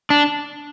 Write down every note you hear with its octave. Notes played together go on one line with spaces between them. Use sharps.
D4